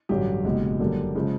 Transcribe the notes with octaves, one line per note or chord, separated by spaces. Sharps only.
A1 G2 D3 F#3 G4
F#1 E2 B2 G#3
F#2 D3 G3 A#3
C#3 F3 G#3